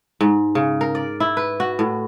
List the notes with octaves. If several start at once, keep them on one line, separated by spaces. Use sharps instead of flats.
G#2
C#3
A#4
D5
E4
B4
F#4
A2